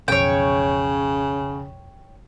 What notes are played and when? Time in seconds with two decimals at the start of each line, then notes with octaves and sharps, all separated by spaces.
0.08 B1 F2 C#3 C#5 G5